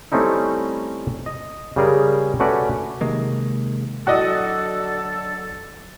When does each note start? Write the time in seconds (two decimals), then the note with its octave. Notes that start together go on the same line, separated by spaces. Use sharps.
0.12 G3 A3 C4 C#4 D#4 E4
1.26 D#5
1.76 C#3 G3 G#4 A#4
2.40 A3 C#4 F#4 B4 D5
3.01 C3 D#3 G#3 A#3
4.07 D3 F#3 F#4 A4 D5 D#5